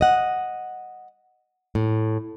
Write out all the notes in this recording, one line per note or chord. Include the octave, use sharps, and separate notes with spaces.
D#5 F#5
A2